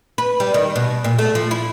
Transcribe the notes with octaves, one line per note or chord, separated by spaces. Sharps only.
B4
G3
D#3
B2
A#2
A3
F3
E4